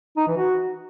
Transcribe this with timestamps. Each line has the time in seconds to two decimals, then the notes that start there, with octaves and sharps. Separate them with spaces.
0.17 D#4
0.27 E3
0.37 F#4